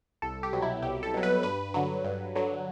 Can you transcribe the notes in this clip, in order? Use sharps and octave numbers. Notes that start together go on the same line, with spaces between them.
C2 A4
G4
B2 F#3
E4
C2 G4
A4
B2 F#3
B4
G2 B4
D3 F#3
G2
D3 F#3